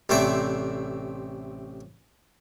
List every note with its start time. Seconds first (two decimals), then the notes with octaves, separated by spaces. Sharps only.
0.09 A1 C3 A3 C4 D5 E5